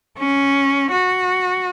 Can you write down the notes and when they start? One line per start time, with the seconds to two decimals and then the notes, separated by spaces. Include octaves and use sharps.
0.19 C#4
0.92 F#4